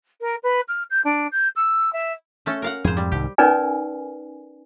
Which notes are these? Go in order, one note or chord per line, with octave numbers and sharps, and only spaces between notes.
A#4
B4
F6
G6
D4
G6
E6
E5
A3 C#4 A4
A#4 F5 F#5
F2 G#2 G#4 C5
G3
C2 G#2 D#3 G4
C#4 D#4 A#4 B4 D5 G#5